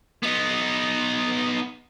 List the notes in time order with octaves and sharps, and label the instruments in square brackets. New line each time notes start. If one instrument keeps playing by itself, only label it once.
[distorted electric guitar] B3 D#4